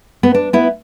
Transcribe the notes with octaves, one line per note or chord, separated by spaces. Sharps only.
B3
D4
B3 E4